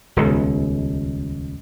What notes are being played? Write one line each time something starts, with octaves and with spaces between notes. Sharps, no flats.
D#1 C#2 B2